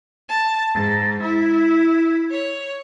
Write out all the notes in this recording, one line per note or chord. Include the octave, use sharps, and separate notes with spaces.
A5
G#2
E4
C#5